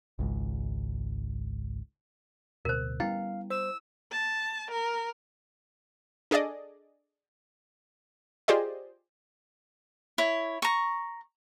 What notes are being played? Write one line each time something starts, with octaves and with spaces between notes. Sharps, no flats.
G#1 C#2 G#2
D1 D2 B2 A#4 C5
G3 B3 C#4 E4 F5 G5
C5 E6
A5
A#4
D4 G#4 A4 D5 D#5
F4 G4 G#4 C5 D5 D#5
E4 C#5
A#5 C#6